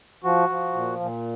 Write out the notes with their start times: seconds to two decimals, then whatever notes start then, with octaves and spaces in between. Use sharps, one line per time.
0.24 F3 F#4
0.49 F3
0.74 A#2
1.00 A#2